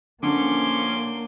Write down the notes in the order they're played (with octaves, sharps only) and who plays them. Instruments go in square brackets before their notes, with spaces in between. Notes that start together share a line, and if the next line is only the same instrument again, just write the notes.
[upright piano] D3 [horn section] F3 C#4 [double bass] A#3 [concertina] C6 D6